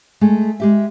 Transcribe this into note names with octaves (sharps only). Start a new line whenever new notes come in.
G#3 A3 G#4
G#3 G4 E5